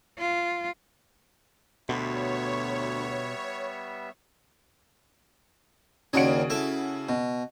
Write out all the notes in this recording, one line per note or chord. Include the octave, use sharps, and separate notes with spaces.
F4
D2 B2 G3 B3 C#5 E5
D#2 C#3 D4 F#4 C#5 D7
E4 A4 E5
B2